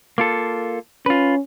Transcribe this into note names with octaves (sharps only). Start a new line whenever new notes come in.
A#3 F4 A4
C#4 F4 B4